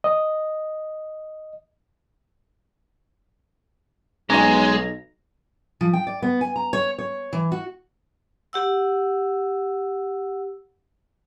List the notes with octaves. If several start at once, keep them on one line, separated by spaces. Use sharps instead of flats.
D#5
B1 G#3 C#4 G#5 A#5
F3
G5
D5
B3
G#5
A#5
C#5
C#5
E3
F#4
G4 F#5 E6